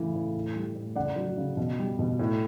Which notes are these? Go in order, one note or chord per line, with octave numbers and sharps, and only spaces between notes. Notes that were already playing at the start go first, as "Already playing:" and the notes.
Already playing: A2 C#3 E3
A2
A2
G3
A2
C#3 D5 F#5
F#3
C#3
B2
G3
B2
A2